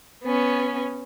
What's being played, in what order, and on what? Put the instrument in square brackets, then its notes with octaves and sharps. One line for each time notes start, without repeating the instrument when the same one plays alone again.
[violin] B3 C#4